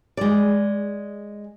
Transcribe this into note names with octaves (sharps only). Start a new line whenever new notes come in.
G#3 D5